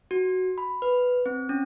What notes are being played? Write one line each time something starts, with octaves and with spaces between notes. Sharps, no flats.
F#4
B5
B4
C4
C#4